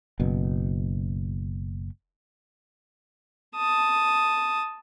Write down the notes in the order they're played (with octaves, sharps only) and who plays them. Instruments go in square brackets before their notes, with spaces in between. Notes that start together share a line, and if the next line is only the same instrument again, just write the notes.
[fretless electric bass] F#1 B2
[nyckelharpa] A5 D#6